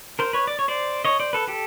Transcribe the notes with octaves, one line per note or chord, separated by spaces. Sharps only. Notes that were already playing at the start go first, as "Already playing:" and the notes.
A#4 C5
B4 C#5
D5
C#5
C5 D5
C#5 D#5
C5 D5
A4 B4
G4 A4